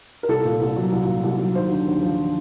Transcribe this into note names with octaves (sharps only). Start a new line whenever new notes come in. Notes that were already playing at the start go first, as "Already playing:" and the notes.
A#4
C2 A4
A#2
C2
F#3
C2
A#2
C2
F#3
D#2 C5
D3
D#2
F3